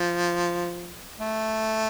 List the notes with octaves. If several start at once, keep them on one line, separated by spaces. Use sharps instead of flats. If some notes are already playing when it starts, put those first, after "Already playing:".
Already playing: F3
A3